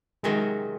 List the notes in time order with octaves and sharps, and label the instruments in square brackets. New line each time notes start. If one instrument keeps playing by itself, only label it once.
[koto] C3 D#3 F#3 C#4 F#4 [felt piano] G#3